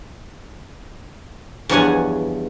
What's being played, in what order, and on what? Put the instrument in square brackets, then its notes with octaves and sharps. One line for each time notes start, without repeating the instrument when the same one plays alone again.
[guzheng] E2 G2 F3 C#5 F#5 G#5